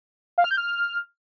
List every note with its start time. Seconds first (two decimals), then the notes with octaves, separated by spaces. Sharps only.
0.38 F5
0.44 F6
0.51 G6
0.57 F6